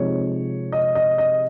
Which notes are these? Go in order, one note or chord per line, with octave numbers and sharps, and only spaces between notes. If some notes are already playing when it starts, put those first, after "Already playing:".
Already playing: C3 F3 G#3 D#4 C#5
D#5
D#5
D#5